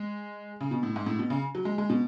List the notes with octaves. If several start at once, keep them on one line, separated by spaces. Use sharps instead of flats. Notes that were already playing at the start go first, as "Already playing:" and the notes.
Already playing: G#3
C#3
B2
A2
G#2
A2
B2
C#3
F#3
G#3
G#3
B2